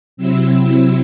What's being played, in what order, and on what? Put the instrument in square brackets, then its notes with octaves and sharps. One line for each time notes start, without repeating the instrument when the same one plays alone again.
[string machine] C3 F#3 C4 E4 E6